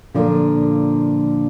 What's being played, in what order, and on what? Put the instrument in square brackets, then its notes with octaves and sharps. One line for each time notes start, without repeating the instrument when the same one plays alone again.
[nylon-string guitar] A#2 D3 F3